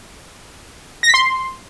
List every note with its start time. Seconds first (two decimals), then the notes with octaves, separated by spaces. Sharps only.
1.03 A#6
1.08 B6
1.14 C6